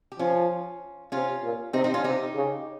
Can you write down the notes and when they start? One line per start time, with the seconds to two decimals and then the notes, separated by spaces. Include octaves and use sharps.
0.12 G4
0.19 F3 C#4 F4
1.12 C3 C#4 F4
1.43 A#2
1.73 C3 C4 D#4
1.84 C4 D#4
1.94 C#4 F4
2.04 C3 D#4 G4
2.35 C#3